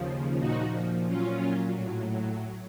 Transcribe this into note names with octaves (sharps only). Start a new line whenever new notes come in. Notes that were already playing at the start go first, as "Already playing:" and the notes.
Already playing: D#2 C#3 F3
A#2 F3 D#4 F#4
A#2 F#3 C#4 F4
A2 F#3